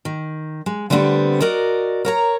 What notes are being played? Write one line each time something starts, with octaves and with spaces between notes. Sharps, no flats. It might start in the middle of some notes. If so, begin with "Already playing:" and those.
D#3
G#3
D3 G3 A3 B3 C4
F#4 A#4 D5 D#5
A#4 C#5 A#5